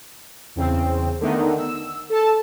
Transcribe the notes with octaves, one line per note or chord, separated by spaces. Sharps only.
E2 C#3 C4
D3 D#3 A3 B3 D#4
E6
A4 A5